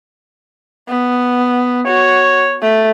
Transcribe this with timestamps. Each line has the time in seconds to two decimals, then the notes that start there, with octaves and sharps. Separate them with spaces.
0.88 B3
1.87 F#4 C#5
2.62 A3